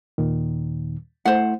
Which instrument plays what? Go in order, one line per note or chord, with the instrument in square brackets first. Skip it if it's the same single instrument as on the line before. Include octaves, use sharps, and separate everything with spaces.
[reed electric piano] D#2 A#2 D#3
[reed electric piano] A3 E4 [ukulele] C5 F#5